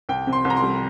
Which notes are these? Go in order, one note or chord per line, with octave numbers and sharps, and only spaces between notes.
C2 G5
C3
C6
C2
A#5
C6
G3